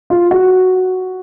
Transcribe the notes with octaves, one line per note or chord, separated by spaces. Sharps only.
F4
F#4